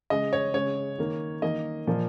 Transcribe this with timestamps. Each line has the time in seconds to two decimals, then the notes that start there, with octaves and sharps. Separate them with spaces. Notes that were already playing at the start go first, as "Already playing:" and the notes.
0.10 C#3 G#3 D#5
0.33 C#5
0.54 C#3 G#3 C#5
0.99 D#3 A#3
1.42 D#3 A#3 D#5
1.87 A#2 F3 A#3